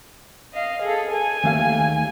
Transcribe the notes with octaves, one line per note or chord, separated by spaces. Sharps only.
D#5 F5
G#4 A4
G#5
D#2 A3 F5